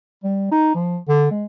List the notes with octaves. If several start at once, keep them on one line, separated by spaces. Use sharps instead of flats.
G3
D#4
F3
D3
G#3